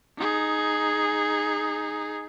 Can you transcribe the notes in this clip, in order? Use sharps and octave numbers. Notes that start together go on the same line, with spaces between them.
D#4 G#4